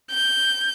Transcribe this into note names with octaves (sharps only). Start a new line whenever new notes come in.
G6